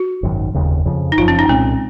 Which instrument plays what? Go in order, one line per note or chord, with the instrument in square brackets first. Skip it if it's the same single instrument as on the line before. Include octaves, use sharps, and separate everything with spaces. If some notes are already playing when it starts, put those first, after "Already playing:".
Already playing: [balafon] F#4
[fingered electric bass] G#1 F#2 D#3
F1 D#2 C#3
F2 C#3 F3
[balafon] D#4
[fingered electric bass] F#1 F#2 F3 [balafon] F4
[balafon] C#4
D#4
[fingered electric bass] C2 A#2 G#3 C#4 [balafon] C4